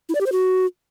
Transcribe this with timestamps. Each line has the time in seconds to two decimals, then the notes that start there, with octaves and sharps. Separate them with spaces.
0.09 E4
0.15 D5
0.21 G4
0.26 C5
0.32 F#4